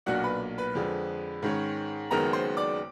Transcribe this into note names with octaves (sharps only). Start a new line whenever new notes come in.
B1 A#2 F#3 A#3 D4 F#4 F#5
B4 B5
B4 B5
F2 D3 F3 G#3
G#2 D#3 G#3 C#4
F#1 F#2 D#3 G#3 B3 A#4 A#5
C5 C6
D5 D6